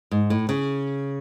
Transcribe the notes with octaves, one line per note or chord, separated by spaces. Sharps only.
G#2
A2
C#3